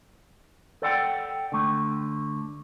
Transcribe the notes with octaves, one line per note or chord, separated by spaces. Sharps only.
A4 D5 F#5 G5
D3 A3